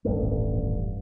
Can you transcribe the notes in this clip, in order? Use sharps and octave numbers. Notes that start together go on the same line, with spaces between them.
D#1 A1 G2 A3